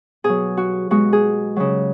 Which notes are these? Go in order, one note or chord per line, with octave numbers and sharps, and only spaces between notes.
B2 F#3 G#4
F#4
B2 G#3 F#4
G#4
C#3 F#3